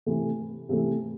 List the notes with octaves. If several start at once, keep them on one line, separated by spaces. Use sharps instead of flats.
C3 E3 A3
C3 E3 A3